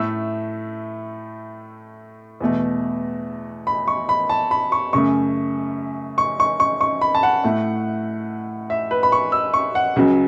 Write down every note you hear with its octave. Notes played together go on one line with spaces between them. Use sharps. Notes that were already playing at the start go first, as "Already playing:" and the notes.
Already playing: A2 A3 E6
E2 B2 A3
B5
C#6
B5
A5
B5
C#6
F#2 C#3 A3 C#6
C#6
C#6
C#6
C#6
B5
A5
F#5
A2 A3
E5
B4
B5
C#6
E6
C#6
F#5
C#2 C#3 F#3